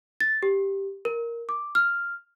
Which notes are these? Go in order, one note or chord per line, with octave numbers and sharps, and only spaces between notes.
A6
G4
A#4
D6
F6